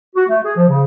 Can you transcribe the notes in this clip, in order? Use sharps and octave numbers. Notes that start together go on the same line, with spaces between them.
F#4
A3
G#4
F3
C#3